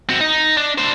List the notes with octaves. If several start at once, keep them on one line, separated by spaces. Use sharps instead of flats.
C4 F#4
D#4
D4
D4 C5